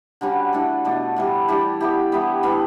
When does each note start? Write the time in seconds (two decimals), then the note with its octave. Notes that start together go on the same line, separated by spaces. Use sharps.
0.21 D3 G3 C#4 F#4
0.53 E3 A3 D4 A4
0.85 B2 A3 D4
1.16 A2 E3 G3
1.48 E3 G3 D4 G4
1.81 G3 B3 E4 G4
2.12 G3 B3 E4
2.43 A2 G3 B3